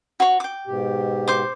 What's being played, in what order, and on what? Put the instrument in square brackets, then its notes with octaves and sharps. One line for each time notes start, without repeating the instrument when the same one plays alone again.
[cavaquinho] F#4 C#5
G5 D6
[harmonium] G#2 B2 G4
[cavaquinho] C5 D6